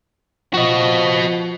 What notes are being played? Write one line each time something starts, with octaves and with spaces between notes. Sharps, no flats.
F3 F#4 D#5